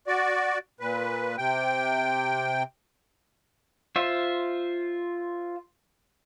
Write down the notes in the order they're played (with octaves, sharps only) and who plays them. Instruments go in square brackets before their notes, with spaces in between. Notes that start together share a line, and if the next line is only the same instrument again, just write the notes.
[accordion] F#4 D5
A#2 B4
C3 G5
[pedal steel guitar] F4 C5 E5